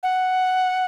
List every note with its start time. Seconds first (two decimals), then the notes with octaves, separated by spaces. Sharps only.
0.03 F#5